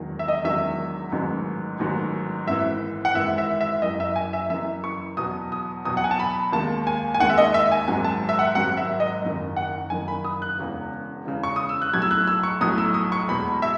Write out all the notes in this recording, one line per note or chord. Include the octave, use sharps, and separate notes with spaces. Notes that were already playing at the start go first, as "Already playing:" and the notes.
Already playing: E1 E2 D#3 F#3
E5
D#5
E1 E2 D#3 F#3 E5
A1 G#2 D#3 F#3
A1 G#2 D#3 F#3
G#1 G#2 E3 E5
F#5
G#1 G#2 E3 E5
E5
E5
F#1 F#2 E3 D#5
E5
G#5
E5
F#1 F#2 E3 E5
C#6
E2 B2 F#3 D#6
D#6
E2 B2 F#3 D#6
F#5
G#5
A5
B5
D#2 D#3 G#3 A5
G#5
G#5
D#2 D#3 G#3 F#5
E5
D#5
E5
G#5
G#1 G#2 F#3 G#5
A5
E5
F#5
G#1 G#2 F#3 F#5
E5
D#5
F#1 F#2 D#3
F#5
F#1 F#2 D#3 G#5
B5
D#6
F#6
E1 E2 C#3 E3
E1 E2 C#3 E3
C#6
D#6
E6
F#6
B1 A2 F#3 G#6
E6
F#6
E6
C#6
B1 A2 F#3 D#6
E6
D#6
C#6
E2 B2 G#3 B5
E5